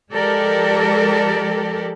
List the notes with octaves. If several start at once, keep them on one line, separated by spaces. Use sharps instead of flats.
F3 G#3 G4 A4 A#4 D5